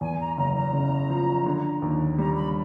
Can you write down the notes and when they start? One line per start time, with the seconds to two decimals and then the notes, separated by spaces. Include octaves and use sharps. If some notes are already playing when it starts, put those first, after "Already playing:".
0.01 E2 G#5
0.19 A#5
0.37 F#1 A#5
0.56 A#5
0.73 C#3
1.10 F3
1.46 D3
1.82 D#2
2.18 G3 A#5
2.36 B5